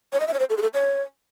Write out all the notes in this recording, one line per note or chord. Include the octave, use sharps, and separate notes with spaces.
C#5
D#5
E5
C#5
C5
A4
G#4
A4
C#5